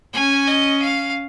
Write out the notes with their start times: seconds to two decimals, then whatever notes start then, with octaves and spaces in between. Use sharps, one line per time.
0.14 C#4 G#5
0.47 D#5
0.81 F5